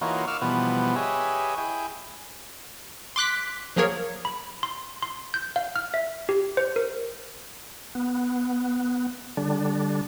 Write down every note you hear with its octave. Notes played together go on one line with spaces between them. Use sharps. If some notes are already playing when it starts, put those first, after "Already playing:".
E3 A#3 D#4 F4 F#4 C#5
F5 C#6 D6 E6 F6
B2 E3 F3 G3 B3
G4 G#4 B4 C#5 D#5 E5
E4 G#4 G5
C6 D6 F#6 B6
F3 F#3 A#3 G#4 A#4 C#5
B5
C6
C6
G6
F5
F6
E5
G4
C5
A#4
B3
D3 G3 D4